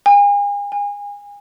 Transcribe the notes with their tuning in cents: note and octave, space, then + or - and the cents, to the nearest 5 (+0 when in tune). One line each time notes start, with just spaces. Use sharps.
G#5 -40
G#5 -30